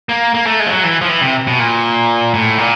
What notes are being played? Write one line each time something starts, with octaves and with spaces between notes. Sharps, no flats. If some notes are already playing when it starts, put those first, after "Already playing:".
A#3
A#3
A3
G#3
F3
F#3
E3
F3
E3
C3
B2
A#2
A2
A#2